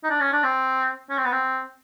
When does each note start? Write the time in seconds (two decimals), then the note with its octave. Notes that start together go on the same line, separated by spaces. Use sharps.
0.04 D#4
0.10 D4
0.21 C#4
0.32 D4
0.44 C4
1.10 C#4
1.18 C4
1.25 B3
1.32 C4